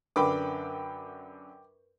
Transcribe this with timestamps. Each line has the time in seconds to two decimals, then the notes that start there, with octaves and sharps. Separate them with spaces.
0.16 F#2 D3 A#4 B4 G5 B5 D6